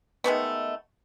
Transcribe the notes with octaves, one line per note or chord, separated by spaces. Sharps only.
D#3 G#3 A3 B3